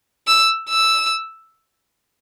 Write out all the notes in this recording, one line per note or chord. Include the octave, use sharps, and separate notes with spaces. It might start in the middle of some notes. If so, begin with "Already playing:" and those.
E6
E6